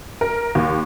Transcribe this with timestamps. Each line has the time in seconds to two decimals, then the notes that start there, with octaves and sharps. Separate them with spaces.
0.21 A#4
0.55 D#2